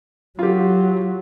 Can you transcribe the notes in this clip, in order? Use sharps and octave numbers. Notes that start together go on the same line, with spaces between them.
F#3 F4 G4